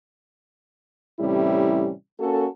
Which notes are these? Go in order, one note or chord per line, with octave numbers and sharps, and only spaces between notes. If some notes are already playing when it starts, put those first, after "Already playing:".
A2 C3 E3 G3 C#4 E4
A#3 C#4 F#4 A4